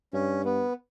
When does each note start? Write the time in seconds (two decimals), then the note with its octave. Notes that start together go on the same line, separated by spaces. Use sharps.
0.13 G2 C#4
0.45 B3